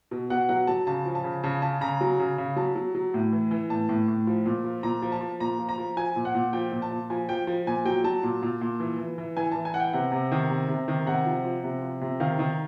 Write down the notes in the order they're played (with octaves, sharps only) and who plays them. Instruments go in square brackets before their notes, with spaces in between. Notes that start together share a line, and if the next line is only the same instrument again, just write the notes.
[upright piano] B2
B2 F#5
F#3 F#5
F#3 A5
C#3 A5
F3
A5
C#3
C#3 A5
C#3 A5
C#3 A#5
F#3
C#3
C#3
F#3 A5
F#3
F#3
A2
E3
E3
A2 A5
A2
A2
F3
A#2
F3
A#2 A#5
F3
A5
F3
A#2 A#5
F3
A#5
F3
F3 G#5
A#2
F#5
A#2
F3 G5
A#2
A5
A#2
F3 G#5
F3 G5
F3
A#2 G#5
F#3 G5
F#3 A5
A#2
A#2
A#2
E3
E3
E3
E3 G#5
E3 A5
G#5
E3 F#5
G5
C3 F#5
C3
D#3
C3
C3
D#3
C3 F#5
F3
F3
C3
F3
C3
D#3 F5
D#3